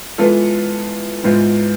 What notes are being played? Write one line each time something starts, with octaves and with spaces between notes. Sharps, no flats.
E3 G#3 B3 F4 A4
G#2 E3 G#3 B3 F4